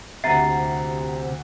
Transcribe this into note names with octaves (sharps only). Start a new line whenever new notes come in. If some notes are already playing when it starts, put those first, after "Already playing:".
D2 C3 E5 F#5 A#5 A6 C7